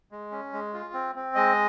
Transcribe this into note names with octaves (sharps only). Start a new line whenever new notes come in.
G#3
C#4
G#3
F4
C4
C4
G#3 D#5